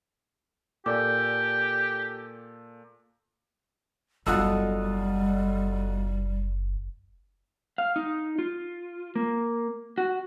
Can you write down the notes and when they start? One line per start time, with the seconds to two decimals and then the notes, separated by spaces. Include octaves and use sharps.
0.86 A#2 G4 A4 D5 D6
4.27 F#1 B1 G3 F4 A4 D#5 F#5 E6
7.78 F5
7.96 D#4
8.39 F4
9.16 A#3
9.98 F#4